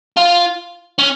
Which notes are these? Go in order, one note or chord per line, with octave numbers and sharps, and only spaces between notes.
F4
C#4